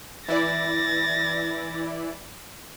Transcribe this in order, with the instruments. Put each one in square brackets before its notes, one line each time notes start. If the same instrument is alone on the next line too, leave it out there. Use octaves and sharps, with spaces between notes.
[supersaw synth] E3 E4 D5 [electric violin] A6 A#6